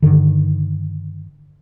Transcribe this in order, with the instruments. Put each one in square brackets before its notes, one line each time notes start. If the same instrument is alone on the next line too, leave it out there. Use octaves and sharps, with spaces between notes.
[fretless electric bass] G2 D3 D#3